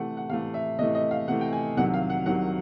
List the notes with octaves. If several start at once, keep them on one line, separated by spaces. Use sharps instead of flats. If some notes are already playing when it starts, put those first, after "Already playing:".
Already playing: C3 E3 A3 F#5
F#5
C3 E3 A3 F5
E5
C3 E3 A3 D#5
D#5
F5
C3 E3 A3 F#5
G5
G#5
C2 C3 D#3 F#3 F#5
F5
F#5
C2 C3 D#3 F#3 F#5